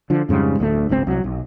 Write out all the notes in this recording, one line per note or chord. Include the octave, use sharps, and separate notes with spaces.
D3 F3
F2 G#2 C#3 G3
D1 D2 F#3 A3
G#1 C#2 C#3 C4
C2 F#3
B1